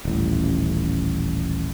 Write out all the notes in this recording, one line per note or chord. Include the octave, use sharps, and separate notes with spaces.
D#1 A1